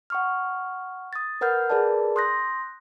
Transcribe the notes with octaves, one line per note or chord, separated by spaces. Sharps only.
F#5 C#6 F6
D#6 A6
A#4 B4 F#5 F6 G6
G#4 A#4 B4 D5 A5
C6 D#6 F#6 G6 A#6